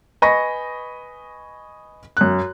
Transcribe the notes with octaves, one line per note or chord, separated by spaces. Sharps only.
B4 D#5 G#5 B5 C#6 A#6
F#2 F#6